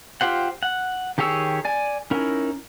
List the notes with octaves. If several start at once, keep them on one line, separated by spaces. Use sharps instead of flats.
F4 G4 C5 F#5
F#5
D#3 G4 G#4 C#5 E6
D5 G#5
C#4 D#4 E4 A#4